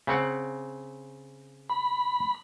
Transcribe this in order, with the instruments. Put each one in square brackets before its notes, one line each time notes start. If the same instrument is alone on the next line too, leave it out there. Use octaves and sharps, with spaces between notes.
[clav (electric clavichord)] C#3 C4 F#5
[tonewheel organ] B5